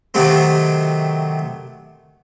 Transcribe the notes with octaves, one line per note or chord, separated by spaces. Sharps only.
C3 D#3 F#3 A3 C4